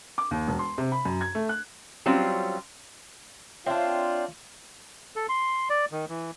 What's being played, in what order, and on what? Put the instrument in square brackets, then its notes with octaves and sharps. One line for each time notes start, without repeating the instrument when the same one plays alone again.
[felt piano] D6
D#2
E1
C6
C3
B5
F#2
G#6
A3
F#6
[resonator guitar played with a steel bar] F#3 G3 C4 C#4 F4
[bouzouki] C4 D4 [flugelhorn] F4 [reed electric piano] C#5 E5 F5
[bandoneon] A4
C6
D5
D#3
E3